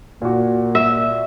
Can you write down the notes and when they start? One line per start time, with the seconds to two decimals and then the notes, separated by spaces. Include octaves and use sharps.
0.22 A#2 A#3 F#4
0.75 E5